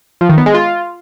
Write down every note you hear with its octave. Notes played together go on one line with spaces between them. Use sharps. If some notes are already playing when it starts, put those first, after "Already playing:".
F3
D#3
B3
G#3
F4